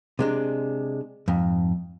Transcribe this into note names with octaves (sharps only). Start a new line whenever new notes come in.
C3 G#3 D4
F2 G#2